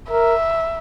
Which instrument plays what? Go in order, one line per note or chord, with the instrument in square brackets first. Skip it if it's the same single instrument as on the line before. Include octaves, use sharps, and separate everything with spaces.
[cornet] A#4 [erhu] E5